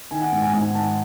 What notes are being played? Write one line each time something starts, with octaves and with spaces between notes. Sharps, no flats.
D#3 G#5
F#5
G#2
G#5
G#2 G#5
D#3 A5